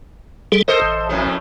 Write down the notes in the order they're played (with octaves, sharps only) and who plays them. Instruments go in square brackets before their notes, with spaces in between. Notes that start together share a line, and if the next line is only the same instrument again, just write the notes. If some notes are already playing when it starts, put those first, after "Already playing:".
[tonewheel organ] G3 G#4 A4
[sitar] A4 C5 D#5 [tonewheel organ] A#4
[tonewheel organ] A1
[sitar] F2 A2 A3